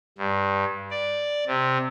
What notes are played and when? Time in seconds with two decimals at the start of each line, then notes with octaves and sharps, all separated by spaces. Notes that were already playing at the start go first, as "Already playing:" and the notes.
0.18 G2
0.91 D5
1.47 C3